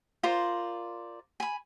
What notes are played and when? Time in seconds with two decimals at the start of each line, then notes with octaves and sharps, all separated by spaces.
0.23 F4 A#4 C5 D5
1.40 G#5 B5